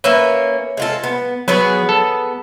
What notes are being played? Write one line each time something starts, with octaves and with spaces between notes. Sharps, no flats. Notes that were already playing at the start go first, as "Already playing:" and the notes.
A#3 C#4 B4 E5
G#3 F4 A4
B3
F#3 B3 G#4 B4
A4